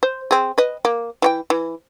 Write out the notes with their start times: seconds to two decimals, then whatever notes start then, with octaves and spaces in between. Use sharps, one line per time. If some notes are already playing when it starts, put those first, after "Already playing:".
0.03 C5
0.31 C4 G#4
0.58 B4 D#5
0.85 A#3
1.22 E3 F#4 G5
1.50 E3